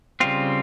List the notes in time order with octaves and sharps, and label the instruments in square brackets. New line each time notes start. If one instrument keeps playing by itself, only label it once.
[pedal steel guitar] C#3 G3 C4 F4